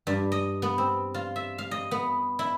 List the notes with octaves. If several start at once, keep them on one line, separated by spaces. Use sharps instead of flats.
G2
D#5
B3
C4
F4
E5
F5
D#5
B3
E4